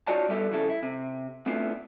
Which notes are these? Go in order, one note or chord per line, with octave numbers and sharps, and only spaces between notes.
D#4 F4 F#4 C#5 D5 A5
G3 B3 E4 G4 A4
F2 C#3 E4 A4
E4
C3
A3 B3 C4 D4 E4 F4